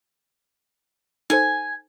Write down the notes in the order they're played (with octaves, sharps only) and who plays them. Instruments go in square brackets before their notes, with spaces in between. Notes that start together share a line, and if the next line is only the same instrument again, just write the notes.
[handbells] D#4 A4 C5 [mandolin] G#5